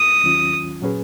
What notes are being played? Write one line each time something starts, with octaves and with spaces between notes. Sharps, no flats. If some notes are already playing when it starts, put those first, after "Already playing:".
Already playing: D#6
D#2 D#3 F#3 C#4 F4
A#2 F#3 C#4 G#4 B4